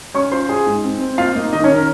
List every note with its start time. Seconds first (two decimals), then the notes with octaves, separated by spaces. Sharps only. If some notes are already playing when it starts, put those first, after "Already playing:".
0.14 C#4 C#5 C#6
0.32 F4 C5 C6
0.49 F4 G#4 G#5
0.66 G#2
0.84 C4
1.00 C4
1.18 A#3 F4 F5
1.35 A#3 D#4 D#5
1.53 D#3 D#4 D#5
1.64 C#4 C#5
1.70 D#3
1.76 A#4